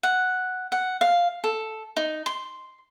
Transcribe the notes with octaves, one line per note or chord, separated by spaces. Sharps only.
F#5
F#5
F5
A4
D#4
C6